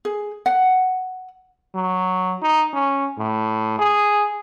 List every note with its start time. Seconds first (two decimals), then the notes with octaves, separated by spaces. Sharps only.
0.05 G#4
0.46 F#5
1.75 F#3
2.42 D#4
2.74 C#4
3.18 A2
3.79 G#4